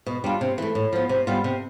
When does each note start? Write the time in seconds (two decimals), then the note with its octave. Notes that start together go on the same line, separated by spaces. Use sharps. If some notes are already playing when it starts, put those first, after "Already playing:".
0.06 B2
0.24 G3 D4 F4
0.41 C3
0.58 E3 A3
0.75 A2
0.93 F3 B3
1.09 C3
1.27 G3 B3 F4
1.44 C3